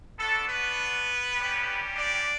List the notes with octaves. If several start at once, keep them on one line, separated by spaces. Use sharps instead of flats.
B3 D4 F#4 A4
B3 B4
G3 C#4 G4
D4 D5